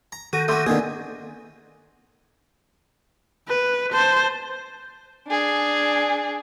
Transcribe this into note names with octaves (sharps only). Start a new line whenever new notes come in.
A#5
D#3 F#4 A4
A3 F#4 C6 D6 G6
D3 D#3 A#3 B3 D4 G#4
B4
C5 A5
D4 G#4